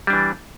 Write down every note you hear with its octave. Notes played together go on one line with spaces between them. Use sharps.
E3 G3 D4